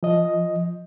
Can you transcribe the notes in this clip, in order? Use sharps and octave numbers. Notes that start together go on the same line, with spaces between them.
F3 D#5